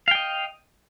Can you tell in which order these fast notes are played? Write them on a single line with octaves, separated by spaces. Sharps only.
F5 G5 D#5